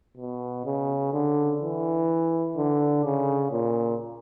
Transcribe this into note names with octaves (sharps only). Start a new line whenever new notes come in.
B2
C#3
D3
E3
D3
C#3
A#2